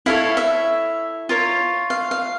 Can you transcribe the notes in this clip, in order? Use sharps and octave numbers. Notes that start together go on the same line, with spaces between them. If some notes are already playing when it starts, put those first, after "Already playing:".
E4 A4 C#5 F5
E5
F4 A#4 C#5
F5
F5